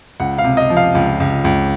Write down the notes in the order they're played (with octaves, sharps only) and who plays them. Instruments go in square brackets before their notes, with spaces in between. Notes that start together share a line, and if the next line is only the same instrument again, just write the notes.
[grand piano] C#2 F#5
F5
C3
D#5
F3
F5
C#2
C#2
C#2